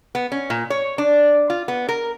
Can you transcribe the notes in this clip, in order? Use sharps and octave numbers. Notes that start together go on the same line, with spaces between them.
B3
C#4
A#2
C#5
D4
F4
B3
A#4